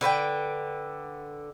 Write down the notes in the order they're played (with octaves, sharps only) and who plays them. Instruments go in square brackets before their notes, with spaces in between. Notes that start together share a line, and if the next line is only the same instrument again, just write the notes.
[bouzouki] D3 B4 C5 G5